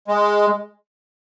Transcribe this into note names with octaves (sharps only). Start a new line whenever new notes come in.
G#3